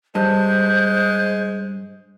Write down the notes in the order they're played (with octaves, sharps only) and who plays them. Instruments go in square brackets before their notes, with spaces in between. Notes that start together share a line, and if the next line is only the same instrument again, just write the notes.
[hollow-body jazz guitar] G2 [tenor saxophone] G#3 [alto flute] C5